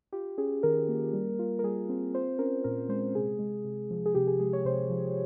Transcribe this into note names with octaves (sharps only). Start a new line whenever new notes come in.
F4 G4
C#4 G#4
D#3 A#4
A#3
G3
F4
A#4
G3 G#4
C4
F4 C5
C#4 A#4
A#2 A#4
G#3 C5
C3 G#4
G#3
C3
F3
G#4
C3 G4
G#4
G#3 G#4
C#5
C3 C5
F3